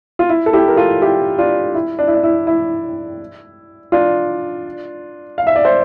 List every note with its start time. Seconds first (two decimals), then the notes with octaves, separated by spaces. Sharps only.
0.19 F4
0.29 E4
0.46 A4
0.53 E4 G4
0.68 A#4
0.77 F4 A4
1.01 E4 G4
1.38 D4 F4
1.74 E4
1.99 D4
2.07 E4
2.15 D4
2.23 E4
2.47 E4
3.92 D4 F4
5.38 F5
5.47 E5
5.56 D5
5.64 C5 E5